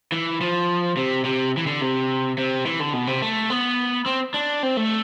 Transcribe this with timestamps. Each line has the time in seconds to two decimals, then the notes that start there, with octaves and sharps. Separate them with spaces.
0.12 E3
0.41 F3
0.97 C3
1.25 C3
1.57 E3
1.67 D3
1.81 C3
2.38 C3
2.66 E3
2.80 D3
2.93 B2
3.07 C3
3.22 A3
3.50 B3
4.06 C4
4.34 D4
4.63 C4
4.77 A3